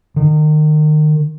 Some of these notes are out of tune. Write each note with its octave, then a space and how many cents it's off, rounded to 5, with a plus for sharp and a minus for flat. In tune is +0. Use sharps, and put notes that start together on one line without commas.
D#3 -30